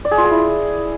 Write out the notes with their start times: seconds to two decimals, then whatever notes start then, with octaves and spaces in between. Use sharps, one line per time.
0.05 D5
0.11 G#4
0.18 F4
0.24 G#4
0.31 E4